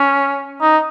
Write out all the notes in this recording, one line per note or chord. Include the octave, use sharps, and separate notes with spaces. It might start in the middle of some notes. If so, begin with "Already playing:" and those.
Already playing: C#4
D#4